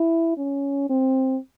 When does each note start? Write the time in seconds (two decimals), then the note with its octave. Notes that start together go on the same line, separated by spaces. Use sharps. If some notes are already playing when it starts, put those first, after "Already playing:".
Already playing: E4
0.38 C#4
0.90 C4